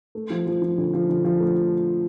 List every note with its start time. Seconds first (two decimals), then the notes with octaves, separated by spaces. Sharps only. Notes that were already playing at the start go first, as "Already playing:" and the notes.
0.15 A3
0.30 F3
0.47 F3
0.62 F3
0.78 D3
0.94 F3
1.09 D3
1.25 F3
1.40 A3